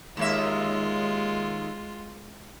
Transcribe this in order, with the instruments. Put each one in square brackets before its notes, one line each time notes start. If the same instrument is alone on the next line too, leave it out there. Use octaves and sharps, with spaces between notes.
[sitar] D#2 A#3 E5 [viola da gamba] G#3 F4